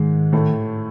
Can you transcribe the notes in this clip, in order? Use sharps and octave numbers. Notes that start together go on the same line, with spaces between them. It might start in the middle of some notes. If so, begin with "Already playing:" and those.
Already playing: G#2 D#3 G#3
A2 A3